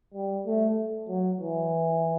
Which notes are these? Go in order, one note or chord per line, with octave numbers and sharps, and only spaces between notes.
G3
A3
F#3
E3